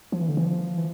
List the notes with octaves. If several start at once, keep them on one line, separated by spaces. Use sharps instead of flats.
F3
E3
D3
E3
F3
E3